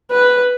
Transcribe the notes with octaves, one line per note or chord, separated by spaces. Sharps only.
B4